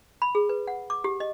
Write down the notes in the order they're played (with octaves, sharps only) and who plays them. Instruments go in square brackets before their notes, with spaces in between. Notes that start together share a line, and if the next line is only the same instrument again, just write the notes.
[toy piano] B5
G#4
B4
F#5
D6
G4
D#5